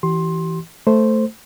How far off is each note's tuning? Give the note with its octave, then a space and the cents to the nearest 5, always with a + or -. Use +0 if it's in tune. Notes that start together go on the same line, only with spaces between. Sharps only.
E3 +0 G4 -40 C6 +15
A3 +0 C5 +0